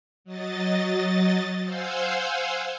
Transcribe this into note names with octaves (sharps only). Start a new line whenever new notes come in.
F#3 D#5 A6
C5 F5 F#5 G#5 E6 G6